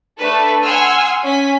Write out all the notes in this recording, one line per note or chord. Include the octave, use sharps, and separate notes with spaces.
A3 D4 A4 B4
F#5 G#5 C6 E6 F6
C#4 G#5 B6